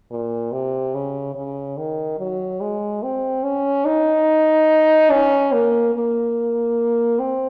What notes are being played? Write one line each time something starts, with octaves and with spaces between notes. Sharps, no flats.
A#2
C3
C#3
C#3
D#3
F#3
G#3
C4
C#4
D#4
C#4
A#3
A#3
C4